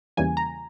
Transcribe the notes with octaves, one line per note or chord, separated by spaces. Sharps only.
E2 C#3 E3 G3 A#3 G#5
A#5